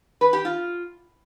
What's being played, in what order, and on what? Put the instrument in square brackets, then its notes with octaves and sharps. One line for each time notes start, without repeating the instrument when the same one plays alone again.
[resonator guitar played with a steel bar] B4
G4
F4